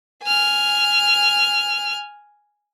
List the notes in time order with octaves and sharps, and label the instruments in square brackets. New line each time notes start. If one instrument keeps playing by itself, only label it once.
[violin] G#5 F6